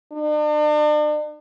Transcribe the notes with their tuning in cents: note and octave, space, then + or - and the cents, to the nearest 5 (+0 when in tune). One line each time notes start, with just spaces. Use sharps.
D4 +40